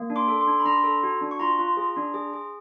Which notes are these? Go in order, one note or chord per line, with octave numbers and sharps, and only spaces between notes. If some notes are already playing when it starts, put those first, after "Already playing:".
Already playing: A#3
D4
C6 D6
A4
C6 D6
D4
B5
D4 A#5 C6
A4
F#4
D4
C#6
F4 A#5 C6
F4
G#4
D4
G#4
G#4